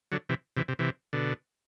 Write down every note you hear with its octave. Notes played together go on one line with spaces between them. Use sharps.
D3 F#3
C3 E3
C3 E3
C3
C3 E3
B2 D3